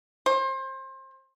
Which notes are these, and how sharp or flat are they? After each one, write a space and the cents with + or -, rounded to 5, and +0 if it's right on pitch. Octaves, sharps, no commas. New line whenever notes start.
C5 +30